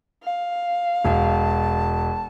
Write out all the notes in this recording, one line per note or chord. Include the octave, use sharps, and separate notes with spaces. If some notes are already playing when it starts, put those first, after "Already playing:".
F5
E1 A5